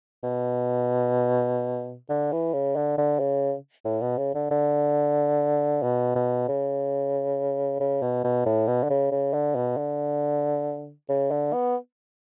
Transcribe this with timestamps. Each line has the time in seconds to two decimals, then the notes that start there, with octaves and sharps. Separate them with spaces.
0.23 B2
2.09 D3
2.32 E3
2.53 C#3
2.76 D3
2.97 D3
3.19 C#3
3.85 A2
4.01 B2
4.18 C#3
4.34 D3
4.51 D3
5.83 B2
6.15 B2
6.48 C#3
7.80 C#3
8.02 B2
8.24 B2
8.46 A2
8.68 B2
8.83 D3
8.90 C#3
9.11 C#3
9.33 D3
9.55 B2
9.77 D3
11.09 C#3
11.31 D3
11.53 B3